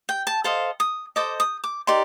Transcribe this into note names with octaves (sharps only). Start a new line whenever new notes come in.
G5
A5
A4 C5 D#5 F5
D#6
A4 C5 D#5 D6
D#6
D6
D#4 G4 A#4 D5 C6